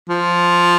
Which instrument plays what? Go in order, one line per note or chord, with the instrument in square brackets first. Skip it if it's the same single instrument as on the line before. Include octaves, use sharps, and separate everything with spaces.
[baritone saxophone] F3